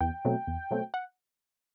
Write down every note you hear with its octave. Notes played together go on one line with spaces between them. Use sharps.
E2 G5
B2 F#3 A3 C4
E2
B2 F#3 A3 C4
F#5